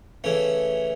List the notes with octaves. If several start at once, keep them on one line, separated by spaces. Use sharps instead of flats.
C#3 E3 A3 C#4